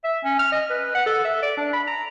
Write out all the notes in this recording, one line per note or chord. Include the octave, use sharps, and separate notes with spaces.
E5
C#4
F6
D#5
B4
F#5
A4
E5
D5
D4
B5
A#5